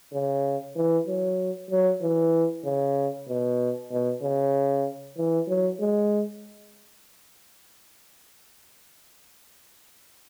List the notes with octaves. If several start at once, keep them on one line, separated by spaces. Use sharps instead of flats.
C#3
E3
F#3
F#3
E3
C#3
B2
B2
C#3
E3
F#3
G#3